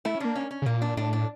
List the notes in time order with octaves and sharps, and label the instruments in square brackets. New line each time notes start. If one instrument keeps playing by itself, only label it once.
[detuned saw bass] A3 [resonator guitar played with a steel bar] E4
[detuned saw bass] C#4
[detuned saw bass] A#3 [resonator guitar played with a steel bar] D4
[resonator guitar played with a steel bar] C#4
C#4
[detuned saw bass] C#3
[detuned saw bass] A#2 [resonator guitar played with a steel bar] A#3
[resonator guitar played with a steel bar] D4
[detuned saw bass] A2 [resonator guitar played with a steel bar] D4
[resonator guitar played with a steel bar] D4